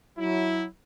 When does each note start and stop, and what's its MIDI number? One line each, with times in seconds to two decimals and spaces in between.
0.18 0.65 54
0.18 0.65 64